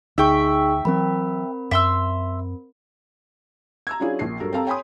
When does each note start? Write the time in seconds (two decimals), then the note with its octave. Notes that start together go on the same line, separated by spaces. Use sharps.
0.18 D2 D#4 G#4 E5 G5 C#6
0.85 E3 F#3 C4 A#4 B5
1.71 F#2 E5 C6 E6
3.87 A#5 E6 G#6
4.00 F#3 C#4 D4 E4 F4 G#4
4.19 A#1 C7
4.40 G2 F#3 A4 A#4
4.53 C4 G4 A4 F5 A5 A#5
4.66 C#5 G5 G#5 B5 C6 D#6